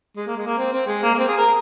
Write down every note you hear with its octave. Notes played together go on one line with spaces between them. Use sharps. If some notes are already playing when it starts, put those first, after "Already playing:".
G#3
A#3
G#3
A#3
C4
C4
G#3
A#3
A#3
C4
G#4
A#4